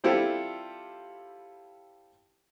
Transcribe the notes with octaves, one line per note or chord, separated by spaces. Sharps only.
G3 C4 E4 F4 G4 A4